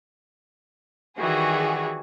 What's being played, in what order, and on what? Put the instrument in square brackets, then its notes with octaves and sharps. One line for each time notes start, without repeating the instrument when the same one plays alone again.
[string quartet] D#3 E3 G3 [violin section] F#4 G#4